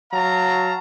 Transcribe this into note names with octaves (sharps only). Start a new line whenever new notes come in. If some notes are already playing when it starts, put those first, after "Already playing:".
F#3 F5 A5 A#5